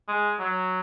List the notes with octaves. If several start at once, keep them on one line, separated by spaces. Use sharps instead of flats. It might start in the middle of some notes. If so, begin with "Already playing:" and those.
G#3
F#3